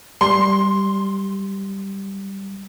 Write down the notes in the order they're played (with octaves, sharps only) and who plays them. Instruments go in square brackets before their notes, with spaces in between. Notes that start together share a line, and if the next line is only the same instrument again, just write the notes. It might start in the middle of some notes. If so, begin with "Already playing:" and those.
[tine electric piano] G3 [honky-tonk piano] C6